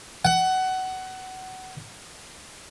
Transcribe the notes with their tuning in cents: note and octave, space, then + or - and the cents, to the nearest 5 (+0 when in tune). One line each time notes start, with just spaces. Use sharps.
F#5 +20